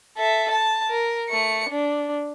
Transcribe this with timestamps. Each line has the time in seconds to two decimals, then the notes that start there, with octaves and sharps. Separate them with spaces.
0.17 A4 E5
0.51 A5
0.89 A#4
1.29 A3 C#7
1.69 D4